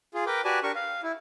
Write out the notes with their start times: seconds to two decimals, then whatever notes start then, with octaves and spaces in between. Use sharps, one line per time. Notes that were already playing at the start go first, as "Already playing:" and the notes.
0.14 F4 G#4
0.26 A#4 B4 G5 D6
0.45 F#4 G4 B4 D5 G#5 A5
0.63 D4 G4 A#4 C#6
0.75 F5
1.03 E4